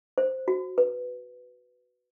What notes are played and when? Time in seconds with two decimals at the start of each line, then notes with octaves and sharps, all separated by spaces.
0.18 C5
0.48 F#4
0.78 B4